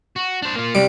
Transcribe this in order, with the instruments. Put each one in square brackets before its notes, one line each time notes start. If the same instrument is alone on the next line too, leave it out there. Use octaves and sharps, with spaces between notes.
[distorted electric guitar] F#4
D4 C5
A#3 F4
[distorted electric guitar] C2 [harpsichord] G3